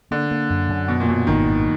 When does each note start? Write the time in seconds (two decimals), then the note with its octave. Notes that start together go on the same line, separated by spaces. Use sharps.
0.11 D3 A#3
0.31 A#3
0.50 F#2
0.69 F#2
0.88 B2 D#3
1.00 A#2
1.08 F#2 B2
1.27 G#1 D#3
1.47 F#2